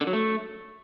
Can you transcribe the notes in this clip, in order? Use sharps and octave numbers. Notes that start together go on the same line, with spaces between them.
D3
F#3
A3